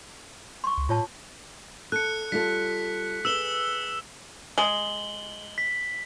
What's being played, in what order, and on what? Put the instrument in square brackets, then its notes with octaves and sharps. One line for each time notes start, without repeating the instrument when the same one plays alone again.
[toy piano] C6 C#6
[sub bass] C#2
[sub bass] A2 [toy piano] F4 C#5 A5
[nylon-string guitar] A4 [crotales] F#6 C#7
[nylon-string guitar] G3 F4 A4 [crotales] B6
[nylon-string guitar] G#4 B4 [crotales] E6 E7 G7
[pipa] G#3 [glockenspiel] F#7 G7
[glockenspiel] B6